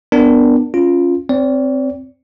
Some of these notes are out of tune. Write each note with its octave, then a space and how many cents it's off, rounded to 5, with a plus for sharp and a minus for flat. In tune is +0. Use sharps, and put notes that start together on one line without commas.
B3 +0 D4 +5 A#4 +0
C#4 +0 F4 +0
C4 +0 D5 -40